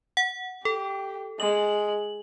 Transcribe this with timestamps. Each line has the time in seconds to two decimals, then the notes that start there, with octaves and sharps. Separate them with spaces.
0.17 F#5
0.65 G4 A4
1.40 G#3 F#7